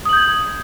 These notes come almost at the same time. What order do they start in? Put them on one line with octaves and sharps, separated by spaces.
D#6 F#7 G6 G#6